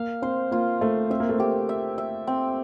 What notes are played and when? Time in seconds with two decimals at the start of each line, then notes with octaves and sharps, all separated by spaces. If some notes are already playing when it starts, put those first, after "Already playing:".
Already playing: A#3 F5
0.22 C4 C5
0.51 A#3 F4
0.81 A3 C5
1.10 C4 E5
1.20 A#3
1.29 A3
1.39 A#3 G4
1.69 E5
1.98 E5
2.27 C4